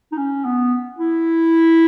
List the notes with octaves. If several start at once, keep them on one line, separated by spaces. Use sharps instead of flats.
D#4
C#4
B3
E4